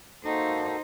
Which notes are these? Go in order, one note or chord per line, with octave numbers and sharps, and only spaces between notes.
A#3 D#4 F#4 A4 C5